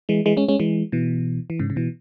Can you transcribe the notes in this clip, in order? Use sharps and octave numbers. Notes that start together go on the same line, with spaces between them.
E3 G#3
E3 G#3
G#3 C#4
G#3 C#4
E3 G#3
B2 E3
E3
G#2 C#3
C#3
B2 E3